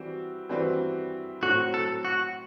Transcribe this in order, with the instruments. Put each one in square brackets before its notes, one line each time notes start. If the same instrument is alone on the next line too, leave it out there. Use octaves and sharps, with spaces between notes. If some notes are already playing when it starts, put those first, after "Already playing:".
Already playing: [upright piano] E3 G3 C4 F#4
E3 G3 C4 F#4 B4
[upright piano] A2 F#3 C4 [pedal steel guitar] F#4
[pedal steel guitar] A4
F#4